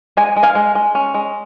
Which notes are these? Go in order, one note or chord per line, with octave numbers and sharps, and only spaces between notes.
G#3 G#5
G#3
F5 G#5
G#3
G#3
C#4
G#3